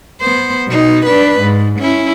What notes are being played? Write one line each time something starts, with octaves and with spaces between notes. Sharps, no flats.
B3 C5
B2 D#4
D4 B4
G#2
C#4 E4